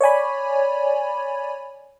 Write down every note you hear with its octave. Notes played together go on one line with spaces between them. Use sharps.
C#5 D5 G#5 B5